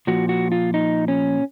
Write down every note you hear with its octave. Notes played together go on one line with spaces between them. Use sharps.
A#2 F3 F#4
F#4
F4
D#4
C#4